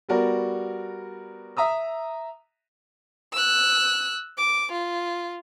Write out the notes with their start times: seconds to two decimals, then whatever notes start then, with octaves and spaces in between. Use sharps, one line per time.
0.09 G3 B3 F#4 A#4 D5
1.57 E5 A#5 D#6 E6
3.33 E6 F#6
4.38 D6
4.72 F4